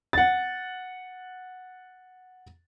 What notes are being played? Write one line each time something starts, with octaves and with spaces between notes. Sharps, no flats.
F#5 A6